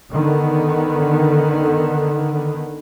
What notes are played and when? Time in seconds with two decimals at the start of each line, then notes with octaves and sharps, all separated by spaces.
0.12 D3 D#3 B3